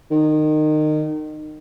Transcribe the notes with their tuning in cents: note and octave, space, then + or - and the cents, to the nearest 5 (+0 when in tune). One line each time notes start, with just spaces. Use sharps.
D#3 -25